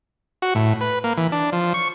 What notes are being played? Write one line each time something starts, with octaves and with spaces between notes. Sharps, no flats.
F#4
A2
B4
A#3
E3
D4
F3
C#6